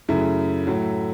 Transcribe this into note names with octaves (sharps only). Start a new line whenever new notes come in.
F#2 C#3 A3 E4
A2 F#3 A3